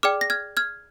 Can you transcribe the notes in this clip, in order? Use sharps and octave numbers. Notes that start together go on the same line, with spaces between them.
G#4 D5 G5 D6 F6
A#6
F6 G#6
F6 G#6